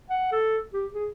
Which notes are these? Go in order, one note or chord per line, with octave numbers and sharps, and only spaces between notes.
F#5
A4
G4
G#4